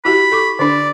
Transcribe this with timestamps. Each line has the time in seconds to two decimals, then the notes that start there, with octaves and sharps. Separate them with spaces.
0.05 E4 F#4 G4 B5
0.32 A4 C#6 D6
0.59 D3 D4 D5